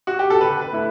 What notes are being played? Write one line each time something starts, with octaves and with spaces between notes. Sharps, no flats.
F#4
G4
A4
D3 B4
B4
A3 E4